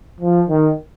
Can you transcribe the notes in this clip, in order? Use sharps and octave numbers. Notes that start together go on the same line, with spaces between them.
F3
D#3